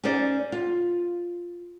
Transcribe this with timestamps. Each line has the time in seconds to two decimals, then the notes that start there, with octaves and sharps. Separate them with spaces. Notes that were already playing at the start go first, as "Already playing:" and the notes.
0.04 C#4 D#4 G#4 C5 D5
0.52 F4